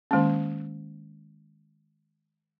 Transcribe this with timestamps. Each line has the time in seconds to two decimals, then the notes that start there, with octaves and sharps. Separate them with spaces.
0.11 D#3 G#3 A#3 C#4